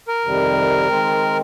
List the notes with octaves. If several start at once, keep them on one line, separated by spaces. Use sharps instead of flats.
A#4
F2 C3 D#3 G3
D#3 G#3 C4